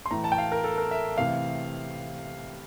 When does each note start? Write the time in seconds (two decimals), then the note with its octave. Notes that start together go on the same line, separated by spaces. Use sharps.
0.06 C6
0.11 A2 E3 A3 A#5
0.24 A5
0.32 G5
0.38 F5
0.52 A#4
0.64 A4
0.78 A#4
0.91 E5
1.18 C3 E3 A3 F5